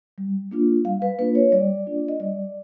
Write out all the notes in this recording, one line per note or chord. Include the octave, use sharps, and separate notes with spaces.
G3
A#3 D4 F4
G3 F5
B4
A#3 D4 F4 B4
C#5
G3 D5
A#3 D4 F4
D#5
G3 D5